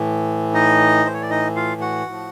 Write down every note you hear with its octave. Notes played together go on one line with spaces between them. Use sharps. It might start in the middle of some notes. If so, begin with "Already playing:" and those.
Already playing: A2 E3
D#4 D#5
C5
C#5
D5
D#4 D#5
F4 F5
F#4 F#5
A2 F3